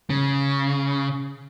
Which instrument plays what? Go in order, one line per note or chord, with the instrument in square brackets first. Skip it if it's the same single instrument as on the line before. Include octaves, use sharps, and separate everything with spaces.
[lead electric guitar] C#3